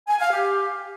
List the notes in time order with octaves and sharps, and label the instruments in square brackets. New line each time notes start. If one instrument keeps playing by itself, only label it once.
[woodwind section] G#5
F5
G4